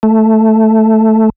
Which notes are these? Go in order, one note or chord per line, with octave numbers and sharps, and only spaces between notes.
A3